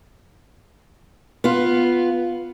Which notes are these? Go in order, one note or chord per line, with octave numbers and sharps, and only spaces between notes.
B3 F4